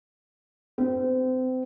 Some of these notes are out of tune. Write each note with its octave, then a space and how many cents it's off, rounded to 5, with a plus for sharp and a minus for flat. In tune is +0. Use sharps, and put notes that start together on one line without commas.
C4 -30